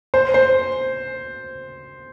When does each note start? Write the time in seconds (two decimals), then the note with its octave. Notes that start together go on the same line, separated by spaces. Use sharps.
0.14 C5
0.34 C5